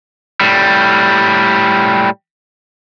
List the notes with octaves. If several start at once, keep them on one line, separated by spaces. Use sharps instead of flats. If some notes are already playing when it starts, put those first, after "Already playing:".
A2 G3